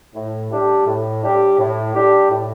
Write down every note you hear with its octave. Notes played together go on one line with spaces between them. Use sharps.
A2
G3 D4 G4
A2
G3 D4 G4
A2
G3 D4 G4
A2